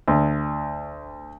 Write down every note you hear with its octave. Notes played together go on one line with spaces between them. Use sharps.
D2